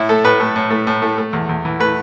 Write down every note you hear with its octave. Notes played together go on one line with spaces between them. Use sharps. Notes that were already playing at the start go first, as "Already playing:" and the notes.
Already playing: A2 E4
A3 A4
A2 B4
A3
A2
A3
A2
A3
A3
E2
E2
E3
A3 B4